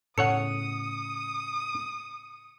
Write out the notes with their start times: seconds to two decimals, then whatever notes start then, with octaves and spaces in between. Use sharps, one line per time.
0.18 A2 C#3 A4 C#5 F#5 D#6 C#7